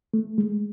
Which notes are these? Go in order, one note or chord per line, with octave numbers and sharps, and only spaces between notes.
A3
G#3